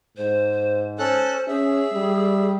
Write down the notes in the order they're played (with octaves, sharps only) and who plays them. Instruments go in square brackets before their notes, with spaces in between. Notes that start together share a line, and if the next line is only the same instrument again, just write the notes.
[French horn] G#2 [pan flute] C5
[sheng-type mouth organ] C#4 A4 F#6 [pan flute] C5
[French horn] C#4 [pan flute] G#4 [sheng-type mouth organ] E5
[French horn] G3